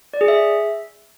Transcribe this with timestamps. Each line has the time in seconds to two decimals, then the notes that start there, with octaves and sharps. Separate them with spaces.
0.14 D5
0.21 G#4
0.28 E5